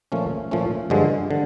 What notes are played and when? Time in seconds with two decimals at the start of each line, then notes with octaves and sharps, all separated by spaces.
0.12 A#2 F3 A3 C#4
0.51 A#2 F3 A3 C#4
0.90 G2 D3 F3 G#3
1.31 D3